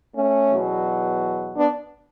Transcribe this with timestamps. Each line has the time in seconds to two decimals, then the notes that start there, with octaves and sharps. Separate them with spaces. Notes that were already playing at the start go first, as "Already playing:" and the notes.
0.16 A3 C#4
0.51 E2 B2 F#3
1.57 B3 D4